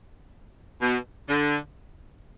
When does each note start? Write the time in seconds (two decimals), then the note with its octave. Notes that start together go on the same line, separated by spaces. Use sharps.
0.82 B2
1.28 D3